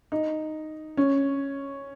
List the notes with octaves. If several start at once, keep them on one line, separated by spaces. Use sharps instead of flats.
D#4
C#4